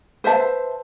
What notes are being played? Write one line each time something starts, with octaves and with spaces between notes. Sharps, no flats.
B4 C5 E5 A5